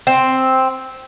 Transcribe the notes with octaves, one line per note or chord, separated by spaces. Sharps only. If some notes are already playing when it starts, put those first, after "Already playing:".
C4